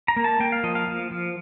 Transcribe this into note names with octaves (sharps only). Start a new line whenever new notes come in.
A#5
A#3
A5
A#3 G5
F5
F3 D#5
F5
F3
F3